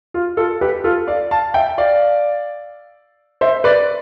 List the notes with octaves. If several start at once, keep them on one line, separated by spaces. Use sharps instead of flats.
F4
F4 A4
G4 B4
F4 A4
D5 F5
F5 A5
E5 G5
D5 F5
C5 E5
B4 D5